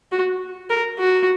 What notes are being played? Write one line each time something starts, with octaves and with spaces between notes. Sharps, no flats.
F#4
A#4
F#4